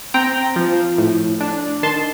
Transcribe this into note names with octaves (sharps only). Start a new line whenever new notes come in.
C4 G5 A#5
F3
A2
D4
D#3 A5 C6